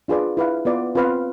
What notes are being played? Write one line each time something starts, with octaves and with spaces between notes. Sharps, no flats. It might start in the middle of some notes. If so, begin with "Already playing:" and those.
D4 F4 G#4 B4 D5
E4 B4 F5
B3 F4 B4 D5
C4 F4 B4 F5